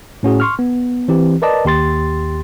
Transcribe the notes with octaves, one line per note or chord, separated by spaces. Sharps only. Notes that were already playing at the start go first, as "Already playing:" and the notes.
A2 C#4 F#4 G#4
C6 C#6 F6
B3
E3 C4 G4
A#4 B4 D5 D#5 A5
D#2 G4 C6 A6